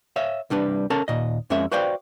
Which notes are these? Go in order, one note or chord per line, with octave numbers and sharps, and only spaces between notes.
C#5 E5 F5
C2 G3 D4 B4
C#4 A4 A#4 A5
D#2 A#2 D#5
F2 G#3 C#4 A#4 E5
F#4 B4 C5 D5 F5 G5